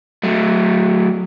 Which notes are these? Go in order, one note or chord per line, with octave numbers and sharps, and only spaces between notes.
F#3 A3